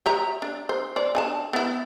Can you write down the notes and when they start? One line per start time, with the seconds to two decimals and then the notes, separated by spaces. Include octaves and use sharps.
0.06 G4 E5 A#5
0.42 D4
0.69 C5
0.96 C5 D5
1.15 D4 G#5 A5
1.53 B3 E4